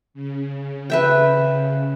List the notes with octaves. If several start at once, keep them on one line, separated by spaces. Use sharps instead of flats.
C#3
B4 E5 G5